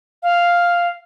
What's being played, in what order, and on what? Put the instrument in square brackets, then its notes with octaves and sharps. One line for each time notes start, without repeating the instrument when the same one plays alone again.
[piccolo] F5